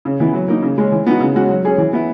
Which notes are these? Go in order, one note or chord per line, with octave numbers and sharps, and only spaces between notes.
C#3
E3 B3 E4
F#3
A#3 D#4
C#3
G#3 C#4
E3
B3 D#4 F#4
C#3
G#3 C#4 F#4
F#3
C#4 G#4
E3
B3 E4